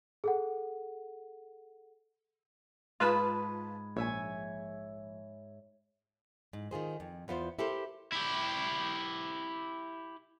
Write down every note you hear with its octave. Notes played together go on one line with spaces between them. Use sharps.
G#4 A4 F#5
G#2 F4 B4 A5 B5 D#6
A#1 C#5 E5 G#5
G#2
D#3 F4 G#4 C5
F2
E2 B3 F4 C5
E4 G4 A4 A#4 C5
E4 G4